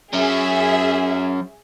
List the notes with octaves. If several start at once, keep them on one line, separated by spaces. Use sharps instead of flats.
F#3 C#4 G#4 E5